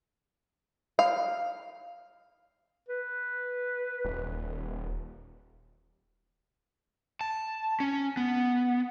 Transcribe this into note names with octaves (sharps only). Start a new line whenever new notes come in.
F5
B4
D#1
A5
C#4
B3